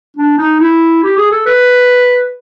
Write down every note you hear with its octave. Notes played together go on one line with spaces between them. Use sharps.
D4
D#4
E4
G4
G#4
A4
B4